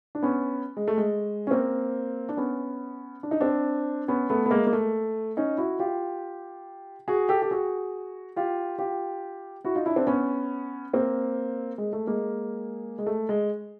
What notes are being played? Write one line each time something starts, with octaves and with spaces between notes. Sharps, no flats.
D4
B3 C#4
G#3
A3
G#3
C#4
A#3 C4
D4
B3 C#4
D4
D#4
C4 D4
B3 C#4
A3 B3
B3
G#3 A#3
A#3
A3
C#4 D#4
E4 F#4
F4 G4
F#4 G#4
G4 A4
G4
F#4 G#4
F4 G4
F4 G4
E4 F#4
D#4 F4
D4 E4
C4 D4
B3 C#4
A#3 C4
G#3
A3
G#3 A#3
G#3
A3
G#3